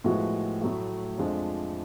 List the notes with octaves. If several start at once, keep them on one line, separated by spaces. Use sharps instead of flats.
A2 F3 G#3 B3 F#4
A2 F#3 A3
F2 F3 G#3 D4